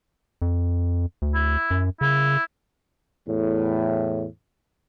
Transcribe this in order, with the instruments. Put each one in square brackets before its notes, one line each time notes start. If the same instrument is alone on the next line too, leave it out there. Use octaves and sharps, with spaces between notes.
[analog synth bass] F2
D2
[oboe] E4
[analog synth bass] F#2
[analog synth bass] C#3 [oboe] E4
[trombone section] E2 A2